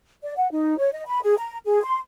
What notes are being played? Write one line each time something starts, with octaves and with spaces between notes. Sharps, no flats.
D5
F#5
D#4
C#5
D#5
B5
G#4
A#5
G#4
C6